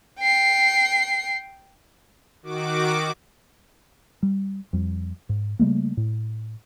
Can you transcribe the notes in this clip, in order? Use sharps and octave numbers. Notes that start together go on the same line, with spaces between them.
G5 C7
D#3 F#4 D6
G3
F2 G3
G#2
C#3 G3 A3 A#3
A2